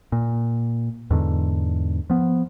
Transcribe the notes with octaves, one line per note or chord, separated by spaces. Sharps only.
A#2
E2 G#2 D3
F3 B3